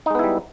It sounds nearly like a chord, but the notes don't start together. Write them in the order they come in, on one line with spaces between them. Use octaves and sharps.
D#4 G#3 B3 E4 G3